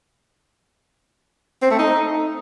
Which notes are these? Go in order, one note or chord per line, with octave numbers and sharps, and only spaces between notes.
C4
A3
D#4